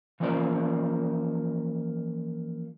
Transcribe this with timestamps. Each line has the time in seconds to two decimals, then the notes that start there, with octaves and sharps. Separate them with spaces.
0.20 E3 F3 A#3 C#4 C5 D5